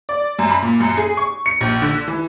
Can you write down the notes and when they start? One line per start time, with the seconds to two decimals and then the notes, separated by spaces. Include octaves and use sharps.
0.09 D5
0.39 F#2
0.51 B5
0.62 A#2
0.80 F#2
0.97 G#4
1.17 C#6
1.46 C#7
1.61 A#1
1.82 D3
2.08 E3